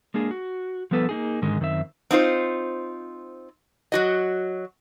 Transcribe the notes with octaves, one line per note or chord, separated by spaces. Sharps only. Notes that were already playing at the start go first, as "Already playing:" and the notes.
G#3 A#3 D4 G#4
F#4
F3 G3 B3 A4 B4
A#3 D#4 G#4
G#2 D3 D#3 G#3
F#2 D#3 C4 E5
C4 D#4 F4 C5
F#3 F#4 D#5